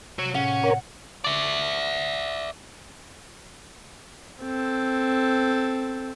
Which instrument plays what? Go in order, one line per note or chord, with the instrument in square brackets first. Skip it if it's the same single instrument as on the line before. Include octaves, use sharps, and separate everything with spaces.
[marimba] C3 [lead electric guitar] F#4 C#5
[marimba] A2 [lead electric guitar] C#4 [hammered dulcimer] F#5
[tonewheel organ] A#4 C#5
[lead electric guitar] D5 E5
[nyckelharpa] C4 A4